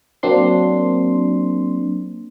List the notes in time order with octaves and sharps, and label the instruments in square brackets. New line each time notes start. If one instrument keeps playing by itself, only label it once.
[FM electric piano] F#3 A#3 C4 D4 C6